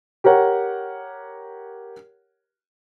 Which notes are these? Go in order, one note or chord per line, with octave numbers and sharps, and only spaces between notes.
G4 A#4 C#5 F#5